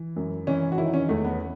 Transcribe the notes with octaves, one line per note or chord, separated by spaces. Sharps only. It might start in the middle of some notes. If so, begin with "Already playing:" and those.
Already playing: E3
F#2
E3 C#4
F#4
D#3 E4
C#4
E2 A3
B3